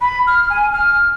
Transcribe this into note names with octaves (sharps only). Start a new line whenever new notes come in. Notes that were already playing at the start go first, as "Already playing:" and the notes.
B5
F6
G#5
F6